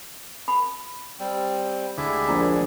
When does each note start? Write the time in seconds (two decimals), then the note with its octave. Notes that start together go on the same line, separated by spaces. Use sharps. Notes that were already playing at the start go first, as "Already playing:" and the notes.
0.48 B5
1.19 G3 C4
1.97 D2 D3 G#3 E4 G4 E5
2.28 A#1 A#5